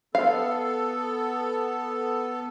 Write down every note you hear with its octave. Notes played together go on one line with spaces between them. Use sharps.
B3 A4 F5